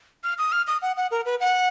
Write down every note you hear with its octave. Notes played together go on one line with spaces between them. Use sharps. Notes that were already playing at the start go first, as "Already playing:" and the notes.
F6
D#6
F6
D#6
F#5
F#5
A#4
B4
F#5